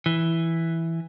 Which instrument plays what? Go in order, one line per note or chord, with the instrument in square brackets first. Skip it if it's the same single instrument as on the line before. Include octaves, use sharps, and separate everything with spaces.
[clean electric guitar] E3